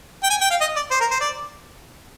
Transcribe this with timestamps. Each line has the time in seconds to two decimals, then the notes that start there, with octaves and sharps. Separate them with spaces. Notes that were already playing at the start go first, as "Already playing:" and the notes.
0.23 G5
0.30 G#5
0.41 G5
0.50 F5
0.61 D#5
0.76 D5
0.91 C5
1.00 A#4
1.11 C5
1.20 D5